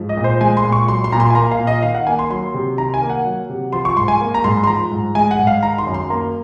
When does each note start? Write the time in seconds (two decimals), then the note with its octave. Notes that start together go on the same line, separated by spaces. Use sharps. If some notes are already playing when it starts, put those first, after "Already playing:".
Already playing: G#2 F3
0.09 D#5
0.17 A#2
0.24 C5
0.41 G#3 G#5
0.57 C6
0.64 A#2
0.72 C#6
0.88 F#3 C6
1.04 C6
1.12 A#2 A#5
1.20 C6
1.30 G#5
1.35 A#3 A#5
1.51 F5
1.59 A#2
1.67 D#5
1.82 D#3 F5
1.95 F#5
2.07 A#3 G#5
2.19 C6
2.30 F#3 C6
2.54 C3
2.78 D#3 A#5
2.94 G#5
3.02 A#3
3.10 F#5
3.25 F#3
3.49 C3
3.73 F3 C6
3.85 C#6
3.96 G#2 C6
4.08 G#5
4.20 A#3
4.34 A#5
4.44 G#2 C6
4.64 C6
4.67 F3 A#5
4.91 G#2
5.15 G#3 G#5
5.31 F#5
5.39 G#2
5.47 F5
5.63 D#3 A#5
5.78 C6
5.87 F#2
5.94 C6
6.10 A#3 A#5